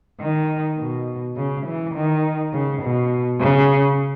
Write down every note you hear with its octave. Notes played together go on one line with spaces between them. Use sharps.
D#3
B2
C#3
E3
D#3
C#3
B2
C#3